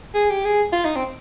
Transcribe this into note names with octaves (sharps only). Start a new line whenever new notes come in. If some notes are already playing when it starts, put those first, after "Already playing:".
G#4
G4
G#4
F4
D#4
C4